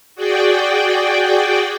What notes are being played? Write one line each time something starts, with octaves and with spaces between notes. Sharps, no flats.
F#4 G#4 D5 G5